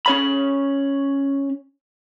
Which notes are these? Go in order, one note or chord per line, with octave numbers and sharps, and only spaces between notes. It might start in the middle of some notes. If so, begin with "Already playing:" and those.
C#4 C#5 B5